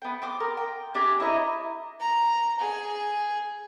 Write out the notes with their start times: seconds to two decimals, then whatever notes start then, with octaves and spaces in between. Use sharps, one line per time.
0.02 B3 G5
0.22 G5 C6 D6 D#6
0.40 A#4
0.57 G5
0.94 D4 G4 G#4 A#5
1.20 E4 C#5 D#5 A#5
2.00 A#5
2.60 G#4